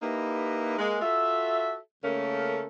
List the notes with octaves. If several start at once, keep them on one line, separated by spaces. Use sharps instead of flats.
A#3 D#4 E4 G4 B4
G#3 A#3
F4 F#4 A4 E5
C#3 A3 A#3 C#4 A4 A#4